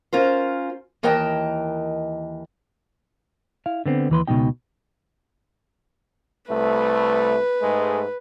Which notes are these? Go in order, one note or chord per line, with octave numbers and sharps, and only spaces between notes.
C#4 F4 A#4 C5
D#2 E3 A#4 D#5 G5 A5
E4 F5
D3 B3 C4
D#2 E3 B4 C6
C#2 B2 D#3 D4 D#4 G5
C2 A3 B4
G#2 G#3 A3